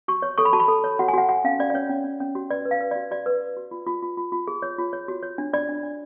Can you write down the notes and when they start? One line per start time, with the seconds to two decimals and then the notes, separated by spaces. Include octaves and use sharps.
0.08 F#4 C#6
0.22 C#5
0.38 A4 C#6
0.45 B5
0.53 F#4 A5
0.60 B5
0.68 A4
0.84 C#5
0.99 F#4 F#5
1.08 G#5
1.14 F#4 F#5
1.29 F#4 F#5
1.44 C#4 F5
1.59 C#4 D5
1.70 D5
1.74 C#4 C#5
1.89 C#4
2.04 C#4
2.21 C#4
2.35 F#4
2.50 B4 D5
2.66 B4
2.71 F5
2.81 B4
2.91 D5
2.96 F#4
3.11 F#4 D5
3.26 B4
3.41 B4
3.57 F#4
3.71 F4
3.87 F4
4.03 F4
4.17 F4
4.32 F4
4.48 G#4
4.62 C#5
4.78 F4
4.93 C#5
5.08 F#4
5.23 C#5
5.38 D4
5.53 D4 D5
5.69 D4
5.83 D4